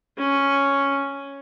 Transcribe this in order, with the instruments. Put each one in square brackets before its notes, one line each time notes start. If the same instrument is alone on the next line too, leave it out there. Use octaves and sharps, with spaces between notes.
[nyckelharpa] C#4